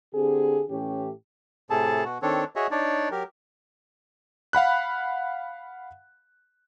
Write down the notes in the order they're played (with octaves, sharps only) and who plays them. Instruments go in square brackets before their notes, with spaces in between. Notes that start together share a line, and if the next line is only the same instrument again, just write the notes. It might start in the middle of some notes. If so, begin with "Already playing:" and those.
[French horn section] D3 C4 G4 G#4
A2 E3 C#4 G4
[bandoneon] A2 C3 G#4 A4 A5
B2 F#4
D#3 C4 D4 A4 C#5
F#4 G#4 C#5 D#5 E5
D4 D#4 C#5 D5
F#3 G4 A#4
[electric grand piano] F5 F#5 B5 F#6